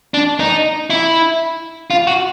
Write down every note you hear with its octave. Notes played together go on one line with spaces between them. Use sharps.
D4
D#4
E4
F4
F#4